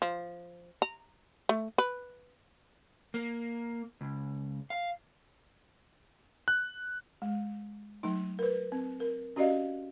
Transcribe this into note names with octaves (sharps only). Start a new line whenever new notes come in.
F3
A#5
A3
B4
A#3
C#2
F5
F#6
G#3
F#3 A3 D#4
A#4 B4
C4
A#4
C#4 F#4 G4 D5 D#5 F5